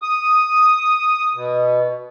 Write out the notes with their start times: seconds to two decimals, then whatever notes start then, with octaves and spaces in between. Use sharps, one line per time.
0.02 D#6
1.35 B2